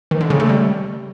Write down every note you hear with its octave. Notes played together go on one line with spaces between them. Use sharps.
D#3
D3
C#3
A3
G3